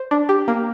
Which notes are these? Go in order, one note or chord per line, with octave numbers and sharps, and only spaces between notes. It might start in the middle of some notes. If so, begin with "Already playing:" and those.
Already playing: C5
D4
G4
A#3